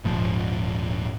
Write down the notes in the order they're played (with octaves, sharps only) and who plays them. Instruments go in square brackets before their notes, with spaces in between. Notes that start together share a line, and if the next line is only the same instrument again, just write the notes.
[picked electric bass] D#1 G#2 F3